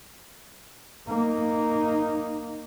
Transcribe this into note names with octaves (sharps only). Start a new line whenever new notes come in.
A#3 D#4